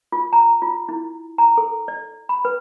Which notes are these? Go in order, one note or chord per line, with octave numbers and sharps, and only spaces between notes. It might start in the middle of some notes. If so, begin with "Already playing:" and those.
F4
A#5
F4
E4
A#5
A4
D5
B5
B4